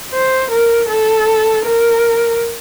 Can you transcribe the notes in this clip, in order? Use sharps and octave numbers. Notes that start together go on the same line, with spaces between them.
C5
A#4
A4
A#4